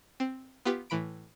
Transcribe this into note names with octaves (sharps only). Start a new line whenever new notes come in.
C4
B3 F4 G4 B4
A2 E3 B5 D7